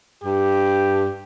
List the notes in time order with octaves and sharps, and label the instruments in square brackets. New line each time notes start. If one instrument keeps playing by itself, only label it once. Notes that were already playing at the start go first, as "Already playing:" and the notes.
[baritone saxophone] G2 [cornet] G4